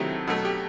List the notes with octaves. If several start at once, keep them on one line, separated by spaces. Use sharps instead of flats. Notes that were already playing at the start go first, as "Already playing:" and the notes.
Already playing: C3 D#3 F#3 A3 E4
B2 F#3 A3
G4